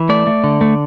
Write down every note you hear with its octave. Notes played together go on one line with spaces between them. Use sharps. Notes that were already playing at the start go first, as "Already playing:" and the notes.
Already playing: E3
A3 D5
A3
D3
A3